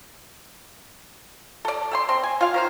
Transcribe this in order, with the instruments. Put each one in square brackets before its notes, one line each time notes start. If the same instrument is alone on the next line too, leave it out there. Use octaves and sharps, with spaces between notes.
[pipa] A4 D5
A4 G5 C6
C4 C6
G#5
F4 F5
D#3 C5 F5